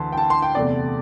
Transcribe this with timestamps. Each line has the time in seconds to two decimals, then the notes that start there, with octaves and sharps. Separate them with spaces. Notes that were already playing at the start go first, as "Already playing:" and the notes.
Already playing: D2 E3 A5 C6
0.13 G5
0.17 A5
0.30 C6
0.42 G5
0.55 E2 C3 A3 D5